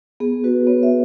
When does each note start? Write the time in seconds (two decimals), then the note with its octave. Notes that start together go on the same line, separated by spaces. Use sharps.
0.20 B3 G#4
0.44 F#4 B4
0.67 B3 C#5
0.83 E5